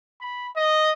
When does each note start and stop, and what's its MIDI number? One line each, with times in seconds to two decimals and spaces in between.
0.21 0.48 83
0.56 0.91 75